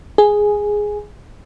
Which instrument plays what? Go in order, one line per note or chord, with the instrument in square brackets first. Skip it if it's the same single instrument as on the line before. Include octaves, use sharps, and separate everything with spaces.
[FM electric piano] G#4